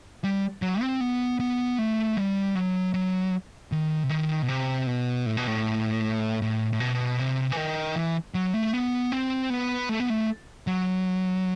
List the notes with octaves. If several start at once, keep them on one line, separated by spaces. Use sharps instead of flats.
G3
F#3
C4
B3
B3
A3
G3
F#3
F#3
D#3
C3
D#3
B2
C3
B2
A2
B2
A2
A2
A2
B2
C3
E3
D#3
E3
F#3
A3
B3
C4
B3
A3
B3
A3
F#3